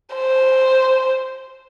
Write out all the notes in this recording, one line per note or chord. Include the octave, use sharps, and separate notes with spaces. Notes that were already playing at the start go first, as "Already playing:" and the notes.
C5